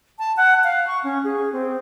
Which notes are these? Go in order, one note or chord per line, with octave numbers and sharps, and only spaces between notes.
A5
F#5
F5
C#6
C#4
G#4
C4